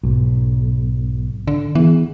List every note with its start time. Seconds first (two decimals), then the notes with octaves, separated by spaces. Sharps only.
0.04 B1 G#2
1.47 D3
1.75 E3 B3 G#4